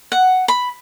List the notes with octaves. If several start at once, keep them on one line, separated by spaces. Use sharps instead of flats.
F#5
B5